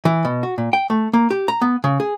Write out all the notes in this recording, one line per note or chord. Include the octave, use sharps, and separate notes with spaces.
E3
B2
F#4
A#2
G5
A3
A#3
G4
A#5
B3
C#3
G#4